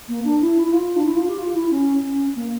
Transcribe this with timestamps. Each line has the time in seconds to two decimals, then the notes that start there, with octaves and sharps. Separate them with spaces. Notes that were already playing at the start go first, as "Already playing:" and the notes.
0.08 A#3
0.24 D4
0.41 E4
0.63 E4
0.73 F4
0.96 D4
1.06 E4
1.16 F4
1.28 G4
1.38 F4
1.54 E4
1.71 C#4
2.03 C#4
2.36 A#3